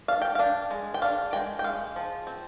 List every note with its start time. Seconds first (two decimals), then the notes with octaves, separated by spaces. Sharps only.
0.08 D4 F5
0.22 G5
0.35 D4 F5
0.70 G#3
0.94 G5
1.02 D4 F5
1.33 G#3 G5
1.59 G5
1.64 G#3 F5
1.96 F3
2.27 C4